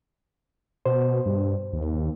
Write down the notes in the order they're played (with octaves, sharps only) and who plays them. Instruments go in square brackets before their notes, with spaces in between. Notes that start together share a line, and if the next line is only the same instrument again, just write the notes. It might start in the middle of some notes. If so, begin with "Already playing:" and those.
[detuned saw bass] B2 [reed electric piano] C5
[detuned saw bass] G2
D#2